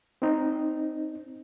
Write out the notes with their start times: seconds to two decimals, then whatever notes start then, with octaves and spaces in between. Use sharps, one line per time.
0.22 C4 D#4